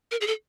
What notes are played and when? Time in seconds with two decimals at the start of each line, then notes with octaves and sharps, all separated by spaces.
0.11 A#4
0.21 G#4
0.27 A4